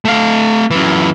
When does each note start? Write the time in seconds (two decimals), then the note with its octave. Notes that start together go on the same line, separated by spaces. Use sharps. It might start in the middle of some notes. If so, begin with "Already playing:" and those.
0.05 A3 F5
0.71 F#2 E3